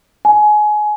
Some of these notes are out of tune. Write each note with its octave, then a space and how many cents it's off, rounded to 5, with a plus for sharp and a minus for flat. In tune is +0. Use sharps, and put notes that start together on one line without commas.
G#5 +25